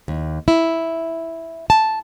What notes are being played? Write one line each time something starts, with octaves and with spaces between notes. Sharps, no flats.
D#2
E4
A5